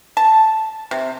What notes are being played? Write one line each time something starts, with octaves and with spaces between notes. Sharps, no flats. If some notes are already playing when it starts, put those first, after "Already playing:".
A5
C3